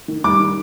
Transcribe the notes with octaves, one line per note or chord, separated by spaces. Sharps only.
D#3
G3 D6
D#3